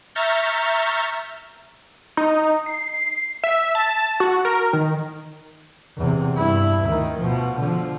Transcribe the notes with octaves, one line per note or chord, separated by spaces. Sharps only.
E5 A#5 C#6 F6 G6 A6
D#4
C7
E5
A5
F#4
A#4
D#3
E2 C3
G2 E4
D2 D#3
B2 F3
D3 F3